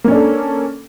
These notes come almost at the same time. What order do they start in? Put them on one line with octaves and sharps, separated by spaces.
A#3 C#4 D4 A4